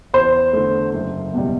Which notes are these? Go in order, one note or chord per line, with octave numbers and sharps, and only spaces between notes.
E2 C5
D3 A3
F#1
E2 B2 G3